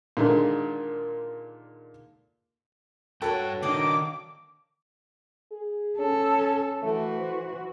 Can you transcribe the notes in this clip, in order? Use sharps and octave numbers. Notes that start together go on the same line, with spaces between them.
A#2 D3 D#3 G#3 A#3
G2 F#4 A4 B4 C#5 F#5 G5 A5
D#3 A#3 D4 D#4 D#5 D6
G#4
C#4 A4
E3 A3 F#4
C5